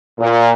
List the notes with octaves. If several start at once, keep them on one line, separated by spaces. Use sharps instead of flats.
A#2